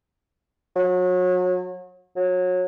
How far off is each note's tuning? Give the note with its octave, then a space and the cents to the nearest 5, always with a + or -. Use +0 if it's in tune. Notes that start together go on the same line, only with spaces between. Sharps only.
F#3 -30
F#3 -25